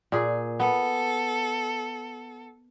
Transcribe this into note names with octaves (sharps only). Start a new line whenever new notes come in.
A#2 G#4
B3 A4